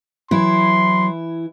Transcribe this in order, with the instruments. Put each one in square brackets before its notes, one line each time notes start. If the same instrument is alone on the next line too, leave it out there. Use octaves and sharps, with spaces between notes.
[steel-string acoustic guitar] E3 E4 [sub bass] F#3 [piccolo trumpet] C6